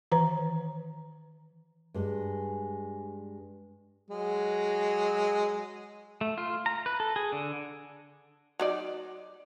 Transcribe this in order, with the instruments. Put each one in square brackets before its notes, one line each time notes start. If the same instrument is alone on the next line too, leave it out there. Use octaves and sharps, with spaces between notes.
[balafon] D#3 E3 B4 C5 A#5
[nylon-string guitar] G2 G#3
[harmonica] F#3 G#3
[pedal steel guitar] A3
F4
A#5
B4
A4
G#4
D3
[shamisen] F#3 D#4 D5